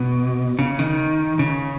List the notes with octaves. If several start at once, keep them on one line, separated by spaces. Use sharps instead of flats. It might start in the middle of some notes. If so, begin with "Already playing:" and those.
Already playing: B2
C#3
D#3
C#3